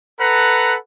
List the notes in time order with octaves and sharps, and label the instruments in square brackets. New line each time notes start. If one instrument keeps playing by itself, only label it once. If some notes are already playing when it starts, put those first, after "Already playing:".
[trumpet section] A4 B4 F#5 A#5